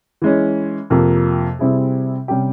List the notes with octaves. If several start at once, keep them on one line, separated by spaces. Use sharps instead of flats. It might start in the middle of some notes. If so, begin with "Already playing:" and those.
E3 G#3 C#4
F2 C3 F3 A#3
C3 G3 C4 E4 G#4
C3 G3 C#4 G4